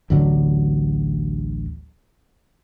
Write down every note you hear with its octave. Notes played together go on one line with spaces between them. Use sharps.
A1 D2 D3 F#3